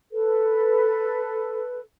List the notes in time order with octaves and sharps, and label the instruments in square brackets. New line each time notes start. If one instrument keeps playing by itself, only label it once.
[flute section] A4 B4